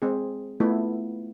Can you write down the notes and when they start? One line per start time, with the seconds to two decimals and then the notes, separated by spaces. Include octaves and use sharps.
0.02 G#3 C4 G#4
0.60 A3 B3 E4 F4